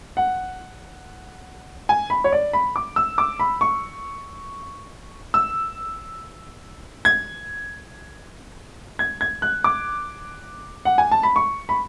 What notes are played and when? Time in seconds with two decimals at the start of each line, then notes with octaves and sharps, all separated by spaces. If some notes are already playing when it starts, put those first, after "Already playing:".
0.17 F#5
1.89 G#5
2.10 B5
2.24 C#5
2.32 D5
2.53 B5
2.76 D6
2.96 E6
3.18 D6
3.40 B5
3.61 C#6
5.34 E6
7.05 G#6
8.99 G#6
9.21 G#6
9.42 F#6
9.64 D6
10.85 F#5
10.98 G#5
11.11 A5
11.23 B5
11.36 C#6
11.69 B5